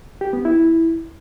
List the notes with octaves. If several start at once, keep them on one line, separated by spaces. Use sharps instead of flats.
G4
B3
E4